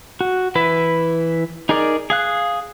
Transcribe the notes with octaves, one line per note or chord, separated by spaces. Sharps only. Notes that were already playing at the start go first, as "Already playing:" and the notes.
F#4
E3 E4 B4 E5
D#4 G#4 A#4 D5
G#4 F5 F#6